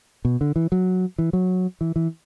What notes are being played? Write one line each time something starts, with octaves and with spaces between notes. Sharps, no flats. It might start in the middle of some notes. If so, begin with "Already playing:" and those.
B2
D3
E3
F#3
E3
F#3
E3
E3